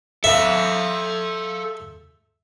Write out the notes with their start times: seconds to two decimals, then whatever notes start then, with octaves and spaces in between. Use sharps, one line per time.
0.24 A4 E5 F5